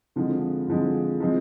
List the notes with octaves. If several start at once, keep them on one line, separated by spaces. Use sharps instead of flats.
F2 D3 F3 G#3
F2 D3 F3 G#3
F3 G#3 C4